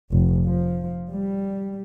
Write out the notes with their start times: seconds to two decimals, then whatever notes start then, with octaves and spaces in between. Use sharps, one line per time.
0.12 F1
0.45 F3
1.12 G3